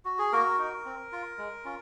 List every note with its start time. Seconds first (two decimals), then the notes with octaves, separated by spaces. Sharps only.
0.05 F#4
0.19 G#4
0.33 A#3 F#4 A#4
0.59 D#4 F#4
0.85 C4
1.12 F4
1.38 G#3
1.65 C#4 F4